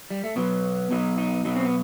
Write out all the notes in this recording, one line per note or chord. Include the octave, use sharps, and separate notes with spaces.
G3
A3
B2 F#3 B3
B2 F#3 D#4
D#4
B2 F#3 D#4
C4
B3